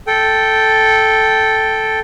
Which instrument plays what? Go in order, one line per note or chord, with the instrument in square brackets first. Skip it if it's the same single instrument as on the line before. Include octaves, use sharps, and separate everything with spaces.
[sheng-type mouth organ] A4 G5